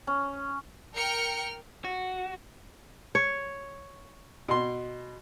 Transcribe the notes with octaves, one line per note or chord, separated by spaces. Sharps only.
C#4
A#4 G5 F6 C#7
F#4
C#5
B2 C6